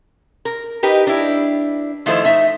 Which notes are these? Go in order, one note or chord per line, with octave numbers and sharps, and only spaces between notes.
A#4
D#4 G4 A#4 B4
D4 E4
D#3 F3 A3 E4 A4 C5
A3 D#4 E5